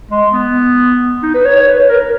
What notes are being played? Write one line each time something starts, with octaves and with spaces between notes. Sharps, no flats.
G#3
B3
D#4
B4
C#5
C#5
B4
B4
A#4
A#4